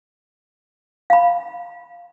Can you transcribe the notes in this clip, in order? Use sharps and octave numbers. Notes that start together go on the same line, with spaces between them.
F5 B5